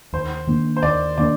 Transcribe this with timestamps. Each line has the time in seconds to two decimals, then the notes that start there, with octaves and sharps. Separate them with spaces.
0.13 D#2 C5
0.47 D#3 A#3 D4
0.77 C5
0.83 D#2 D5
1.18 D#3 A#3 D4 D5